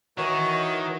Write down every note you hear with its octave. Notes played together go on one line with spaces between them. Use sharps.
D#3 E3 F#4 C#5